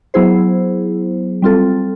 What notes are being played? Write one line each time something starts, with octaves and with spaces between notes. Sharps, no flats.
F#3 B3 E4 G#4 C5
G3 C4 F4 A4